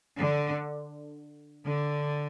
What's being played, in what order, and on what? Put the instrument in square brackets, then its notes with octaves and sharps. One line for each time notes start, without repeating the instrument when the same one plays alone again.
[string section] D3
D3